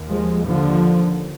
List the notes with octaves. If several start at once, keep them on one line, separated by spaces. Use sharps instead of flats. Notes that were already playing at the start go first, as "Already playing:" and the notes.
Already playing: D#2
F3 G#3
D3 F3